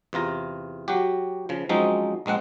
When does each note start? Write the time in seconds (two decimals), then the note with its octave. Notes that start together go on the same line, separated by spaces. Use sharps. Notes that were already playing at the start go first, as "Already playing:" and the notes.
0.13 E2 C3 F4 A#5
0.88 F#3 F#4 G4
1.49 C#3 F3
1.69 F3 F#3 G#3 C4 C#4 D#4
2.26 A#1 G#3 C4 F#5